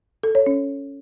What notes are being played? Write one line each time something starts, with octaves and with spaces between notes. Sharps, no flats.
A4
C#5
C#4